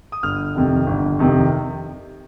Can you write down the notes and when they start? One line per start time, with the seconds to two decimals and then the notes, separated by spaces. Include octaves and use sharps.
0.12 D#6
0.23 G1 F6
0.55 F2 C3 D#3
0.87 G1
1.19 F2 C3 D#3